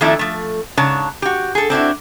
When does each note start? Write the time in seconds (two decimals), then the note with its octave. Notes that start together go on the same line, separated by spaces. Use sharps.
0.01 D#3 F3 A3 C4 D4 E4
0.19 F3 A3
0.77 G#2 C#3 D4 C#5 A5
1.22 F#4 G4
1.55 G#4 A4
1.70 C4 D4 E4 F#4